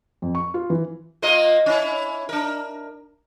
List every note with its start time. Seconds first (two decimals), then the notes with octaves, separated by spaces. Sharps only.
0.22 F2
0.35 C#6
0.54 F4
0.70 E3
1.22 A#3 F4 D#5
1.66 C#4 E4
2.29 D4 A#4